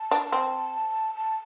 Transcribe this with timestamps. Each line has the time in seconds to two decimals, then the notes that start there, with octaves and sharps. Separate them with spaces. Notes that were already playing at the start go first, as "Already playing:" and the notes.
Already playing: A5
0.11 D4
0.32 C4
1.14 A5